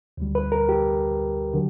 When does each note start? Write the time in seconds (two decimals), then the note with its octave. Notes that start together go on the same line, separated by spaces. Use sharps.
0.18 D2 D3 G3
0.35 B4
0.52 A#4
0.69 G4
1.53 D3 F#3